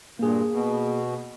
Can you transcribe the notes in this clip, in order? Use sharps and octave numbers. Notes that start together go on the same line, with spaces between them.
G2 A#2 A#3 G#4
B2